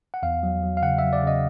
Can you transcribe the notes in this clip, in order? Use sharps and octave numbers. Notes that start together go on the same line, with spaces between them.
F#5
E2 F5
F#3
F#3
F5
C#3 F#5
F#3 E5
D5
C#3 D#5